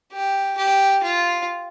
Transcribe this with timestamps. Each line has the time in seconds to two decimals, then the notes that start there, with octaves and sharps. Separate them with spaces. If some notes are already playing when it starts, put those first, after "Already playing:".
0.12 G4
0.57 G4
1.03 F4